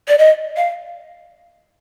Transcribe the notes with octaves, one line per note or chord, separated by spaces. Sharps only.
D5
D#5
F5